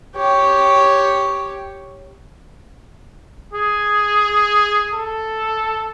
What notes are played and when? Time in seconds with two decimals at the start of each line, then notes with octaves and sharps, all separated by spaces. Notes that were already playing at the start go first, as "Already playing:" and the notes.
0.16 G4 C#5
3.53 G#4
4.94 A4